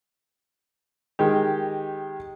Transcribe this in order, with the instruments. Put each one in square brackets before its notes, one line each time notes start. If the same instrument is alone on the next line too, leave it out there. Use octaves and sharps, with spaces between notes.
[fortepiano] D#3 G#3 G4